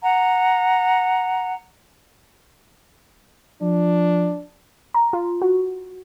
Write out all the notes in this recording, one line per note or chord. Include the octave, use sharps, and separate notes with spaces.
F#5 A#5
F3 D4
A#5
F4
F#4